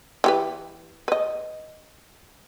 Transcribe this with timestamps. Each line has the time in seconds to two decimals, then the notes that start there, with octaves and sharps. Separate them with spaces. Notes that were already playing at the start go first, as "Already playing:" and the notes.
0.24 E3 G4 B4
1.08 B4 D#5